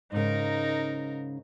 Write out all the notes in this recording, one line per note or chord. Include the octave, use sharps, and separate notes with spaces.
G#2 C#3 D#4 A#4